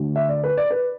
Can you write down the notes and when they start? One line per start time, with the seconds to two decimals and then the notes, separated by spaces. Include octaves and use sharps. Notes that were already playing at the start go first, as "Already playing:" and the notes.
Already playing: D2 D3
0.16 E5
0.29 D5
0.44 B4
0.57 D5
0.71 B4